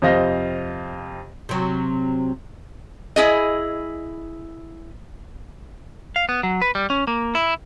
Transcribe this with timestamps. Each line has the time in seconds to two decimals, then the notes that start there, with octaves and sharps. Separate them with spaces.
0.02 F2 C3 C5 D#5 F5 A#6
1.49 C3 F#3
3.16 E4 G#4 D#5
6.16 F5
6.29 B3
6.43 F#3
6.62 B4
6.75 G3
6.90 C#4
7.07 A#3
7.35 E4